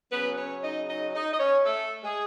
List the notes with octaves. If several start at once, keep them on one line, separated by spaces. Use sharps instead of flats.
C#3 F#3 B3 C#4 B4
C#4 C#5
D#4 D#5
D#4 D#5
D#4 D#5
D#5
C#4 C#5
A3 A4
G#3 G#4